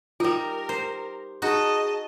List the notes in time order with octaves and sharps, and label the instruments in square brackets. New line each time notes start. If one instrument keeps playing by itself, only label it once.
[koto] G3 D#4 [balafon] F4 [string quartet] A#4
[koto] C5
[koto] D#4 F#4 [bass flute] G#4 [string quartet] D#5 A5